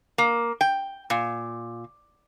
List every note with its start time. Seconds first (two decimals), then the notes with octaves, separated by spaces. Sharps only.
0.18 A#3
0.61 G5
1.10 A#2